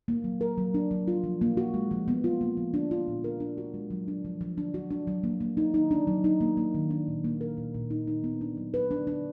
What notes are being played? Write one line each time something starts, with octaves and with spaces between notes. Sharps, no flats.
A#3
F#3
A#4
F#3
D4
F#3
F4
F3
A#3
F#4
G#3
F3
B3
F4
A#3
F3
D4
F4
A#2
A#4
D4
F#4
G#3
F#3
D4
F3
F3
D4
F#4
D4
F#3
A#3
A#3
D#4
D#4
D4
F#3
D#4
A#3
A#3
D#3
D4
A#2
A#3
A#4
A#2
A#2
D#4
D#4
B3
D4
F#3
B4
D4
D4